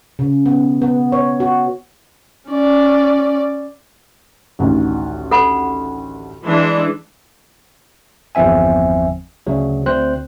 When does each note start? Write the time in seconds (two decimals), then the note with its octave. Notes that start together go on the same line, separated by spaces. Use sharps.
0.19 C#3
0.46 B3
0.82 B3
1.12 C#5
1.40 F#4
2.49 C#4 D5
4.59 A1 D2 D#3
5.31 A4 F#5 B5
6.45 E3 G#3 D4
8.35 G1 E2 F3 C4 E5 G#5
9.47 D2 C#3 F#3
9.86 D2 C4 C5 F#6